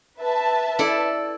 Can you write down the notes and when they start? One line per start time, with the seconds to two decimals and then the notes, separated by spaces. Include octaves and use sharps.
0.19 B4 E5 A5
0.79 E4 A4 D5